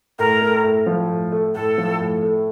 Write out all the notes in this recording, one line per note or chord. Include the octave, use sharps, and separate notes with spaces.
A2 A#4
A3
A2
F3
A2
A3
A2 A4
F3
A2
A3